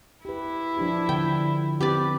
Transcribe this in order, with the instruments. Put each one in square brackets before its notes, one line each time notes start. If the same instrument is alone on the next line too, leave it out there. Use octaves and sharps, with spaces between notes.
[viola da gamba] E4 [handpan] G4 B4
[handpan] F3 D4 G4
[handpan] D3 [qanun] G5
[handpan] C4 [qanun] G4 B4 D5